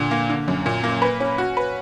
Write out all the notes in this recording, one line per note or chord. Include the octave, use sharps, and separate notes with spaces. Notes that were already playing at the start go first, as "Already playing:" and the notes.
Already playing: A#2 D3
A#3
D3
F#2
A#2
A#3
B4
C#4
F#4
B4